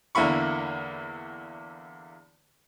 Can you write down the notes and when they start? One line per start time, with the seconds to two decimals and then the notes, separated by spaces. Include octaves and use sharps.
0.15 E2 D3 A#3 E4 B5 C#6